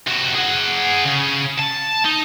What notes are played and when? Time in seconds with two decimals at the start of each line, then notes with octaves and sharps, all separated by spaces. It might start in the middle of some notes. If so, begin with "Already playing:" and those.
0.07 C3 F#4
0.35 G#4 F#5
1.06 C#3
1.58 A5
2.05 D#4